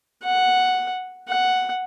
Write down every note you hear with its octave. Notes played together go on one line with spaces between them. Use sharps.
F#5
F#5